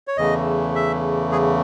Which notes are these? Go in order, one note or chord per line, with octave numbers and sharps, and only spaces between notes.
C#5
E2 C#3 E3 A3 D#5
E5
G#4